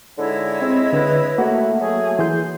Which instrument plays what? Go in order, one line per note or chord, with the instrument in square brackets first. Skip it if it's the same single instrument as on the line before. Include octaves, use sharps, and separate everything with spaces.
[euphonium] G#2 [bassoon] D3 [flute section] E4 C#5 D#5
[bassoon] G#3 [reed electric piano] C4
[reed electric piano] D3 [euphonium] B4
[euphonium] A3 [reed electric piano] A#3 [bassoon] F#4
[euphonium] F#3 [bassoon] A3 [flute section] G#4
[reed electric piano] E3 G#4 G6 [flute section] C6